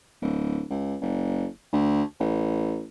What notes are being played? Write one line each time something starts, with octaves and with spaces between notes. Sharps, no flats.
D1
C#2
F#1
D2
A1